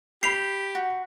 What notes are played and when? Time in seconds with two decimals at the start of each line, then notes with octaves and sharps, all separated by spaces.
0.23 G4 B5 B6 C7 F7
0.75 F#4